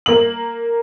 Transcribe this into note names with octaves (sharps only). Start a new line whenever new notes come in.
A#3 F#7